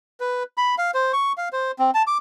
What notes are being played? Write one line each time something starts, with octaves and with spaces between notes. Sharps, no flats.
B4
B5
F5
C5
C#6
F5
C5
C4
A5
D6